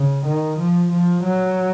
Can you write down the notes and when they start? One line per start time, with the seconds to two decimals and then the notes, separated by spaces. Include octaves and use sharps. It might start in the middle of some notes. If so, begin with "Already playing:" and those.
Already playing: C#3
0.25 D#3
0.58 F3
0.92 F3
1.23 F#3